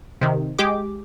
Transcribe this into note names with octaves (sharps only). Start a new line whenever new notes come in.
C3 D#3
G#3 G4 D6